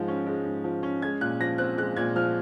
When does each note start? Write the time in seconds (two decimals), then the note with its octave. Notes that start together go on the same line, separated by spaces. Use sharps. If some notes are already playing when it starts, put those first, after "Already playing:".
Already playing: G#2 F3 G#3
0.08 C#4
0.26 G#3
0.45 G#2
0.64 F3
0.83 C#4
1.02 G#3 G#6
1.21 A#2 F#6
1.40 F3 A#6
1.58 C4 F#6
1.78 G#3 F#6
1.96 A#2 G#6
2.16 F3 F6